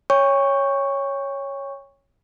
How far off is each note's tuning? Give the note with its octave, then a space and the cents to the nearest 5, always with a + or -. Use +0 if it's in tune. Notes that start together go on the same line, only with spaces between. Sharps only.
C#5 +0 G5 +45 C#6 +0